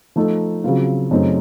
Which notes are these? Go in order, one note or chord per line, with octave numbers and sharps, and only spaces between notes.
F3 A3 D#4 A4
C#3 F#3 C4 F4
F#2 C#3 A3 C4 D#4